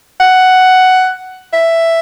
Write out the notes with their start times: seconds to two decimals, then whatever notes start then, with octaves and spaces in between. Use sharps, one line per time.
0.20 F#5
1.53 E5